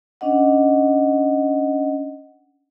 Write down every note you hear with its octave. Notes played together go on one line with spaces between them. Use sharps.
C#4 D4 D#5 F#5